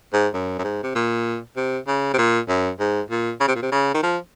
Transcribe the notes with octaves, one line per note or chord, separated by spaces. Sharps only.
G#2
F#2
F#2
G#2
C3
A#2
C3
C#3
C3
A#2
F#2
G#2
A#2
C#3
C3
A#2
C3
C#3
D#3
F3